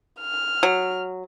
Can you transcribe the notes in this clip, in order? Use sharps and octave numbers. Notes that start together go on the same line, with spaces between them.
F6
F#3